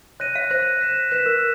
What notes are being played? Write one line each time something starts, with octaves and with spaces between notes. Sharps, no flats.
C#5 F#6 A#6 D#7
F5
C5 F#6 A#6 D#7
F#6 B6 E7
B4 F#6 B6 E7
A#4